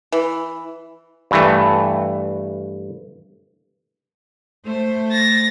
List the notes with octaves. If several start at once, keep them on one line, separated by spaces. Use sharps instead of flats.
E3
G2 E3 A3
A3 C5
A6 A#6